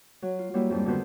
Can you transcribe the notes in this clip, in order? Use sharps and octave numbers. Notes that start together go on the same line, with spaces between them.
F#3
F4
F#3 G3 A#3 E4
F2 G#2 G3
D3 D#3 B3 F#4 B4 C5